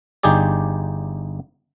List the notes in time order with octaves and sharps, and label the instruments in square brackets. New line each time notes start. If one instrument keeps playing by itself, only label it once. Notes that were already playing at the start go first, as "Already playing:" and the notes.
[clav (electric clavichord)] G1 D#4 G4 G#4 D5